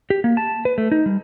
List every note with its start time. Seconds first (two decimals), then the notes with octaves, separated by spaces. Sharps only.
0.10 G4
0.24 A#3
0.37 A5
0.65 B4
0.78 A3
0.91 D#4
1.06 G3